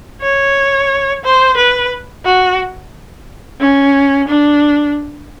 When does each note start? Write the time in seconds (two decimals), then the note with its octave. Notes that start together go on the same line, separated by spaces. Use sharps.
0.21 C#5
1.24 C5
1.57 B4
2.25 F#4
3.60 C#4
4.28 D4